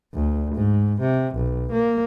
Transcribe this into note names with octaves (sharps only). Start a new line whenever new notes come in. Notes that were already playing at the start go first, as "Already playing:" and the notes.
D2
G#2
C3
B1
A#3